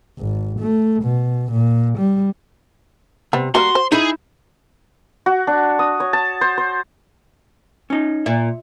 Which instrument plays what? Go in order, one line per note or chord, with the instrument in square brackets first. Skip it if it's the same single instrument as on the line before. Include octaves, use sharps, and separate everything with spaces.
[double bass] G#1
A3
B2
A#2
G3
[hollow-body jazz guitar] C3 [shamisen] G3 B3
[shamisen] G3 A#3 A#4 [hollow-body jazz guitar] F#4 [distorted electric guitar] C6
[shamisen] C5
[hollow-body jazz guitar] D#4 E4 B5 [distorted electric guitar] G#4
[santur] F#4
D4
D#6
C#5
A5
C5
C5
[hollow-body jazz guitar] C#4 D#4
[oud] A#2 [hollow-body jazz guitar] E5